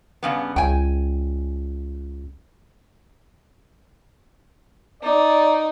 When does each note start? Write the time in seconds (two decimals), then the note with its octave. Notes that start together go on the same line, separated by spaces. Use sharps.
0.23 G2 C#3 B3
0.56 C#2 G5 G#5
5.03 D#4 D5